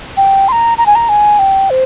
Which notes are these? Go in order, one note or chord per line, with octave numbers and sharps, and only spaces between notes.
G5
C6
A#5
A#5
G#5
A#5
G#5
G5
C5